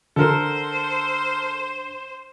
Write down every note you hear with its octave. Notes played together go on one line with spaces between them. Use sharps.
D3 A4 A#4 C5